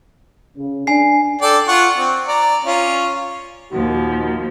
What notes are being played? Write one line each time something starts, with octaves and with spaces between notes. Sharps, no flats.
C#3
D4 G#5 C7
A4 D5 G5
F4 F#5 C#6
C4
D5 A#5
C#4 F4
D#2 A#2 F3 D#4 F#4